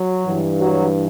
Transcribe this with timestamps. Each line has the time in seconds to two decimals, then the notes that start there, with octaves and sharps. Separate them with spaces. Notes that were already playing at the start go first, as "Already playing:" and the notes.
Already playing: F#3
0.24 G2 E3
0.60 F#3